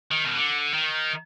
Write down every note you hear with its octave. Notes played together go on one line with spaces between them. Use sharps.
D#3
B2
D3
D#3